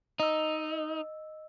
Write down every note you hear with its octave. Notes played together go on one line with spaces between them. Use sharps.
D#4 D#5 E6